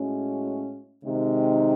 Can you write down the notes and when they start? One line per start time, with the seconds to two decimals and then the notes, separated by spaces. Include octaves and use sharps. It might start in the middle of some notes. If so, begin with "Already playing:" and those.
Already playing: A2 G#3 C#4 F#4
1.04 C3 D#3 G#3 C4 D#4